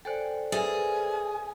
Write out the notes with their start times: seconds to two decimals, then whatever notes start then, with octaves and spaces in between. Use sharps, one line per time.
0.05 A4 C5 D5 G5 G#5 F#6
0.52 G#4 B4 E5 G#5 A6